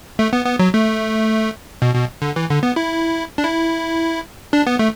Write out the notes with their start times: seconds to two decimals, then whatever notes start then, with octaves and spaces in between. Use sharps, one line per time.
0.19 A3
0.33 B3
0.46 B3
0.59 F#3
0.74 A3
1.82 B2
1.95 B2
2.22 D3
2.36 E3
2.49 D3
2.63 B3
2.76 E4
3.38 D4
3.44 E4
4.53 D4
4.67 B3
4.79 A3